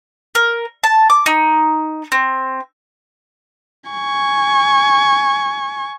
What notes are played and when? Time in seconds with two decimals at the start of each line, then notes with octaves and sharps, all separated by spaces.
0.35 A#4
0.84 A5
1.10 D6
1.26 D#4
2.12 C4
3.90 G#5 C#6